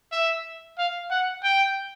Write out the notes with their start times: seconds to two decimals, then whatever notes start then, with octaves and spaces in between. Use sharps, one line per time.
0.12 E5
0.78 F5
1.10 F#5
1.43 G5